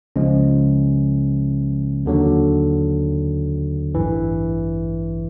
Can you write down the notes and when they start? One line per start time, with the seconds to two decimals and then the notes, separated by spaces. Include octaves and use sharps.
0.16 C#2 C#3 F3 G#3 C#4
2.05 D#2 D3 F#3
3.95 A1 G2 E3